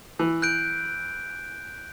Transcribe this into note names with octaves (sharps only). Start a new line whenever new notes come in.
E3
F#6 G6 D7